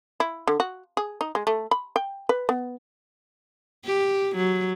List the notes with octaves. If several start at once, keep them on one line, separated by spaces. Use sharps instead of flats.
E4
D3
F#4
G#4
D#4
G#3
A3
B5
G5
B4
B3
G4
F#3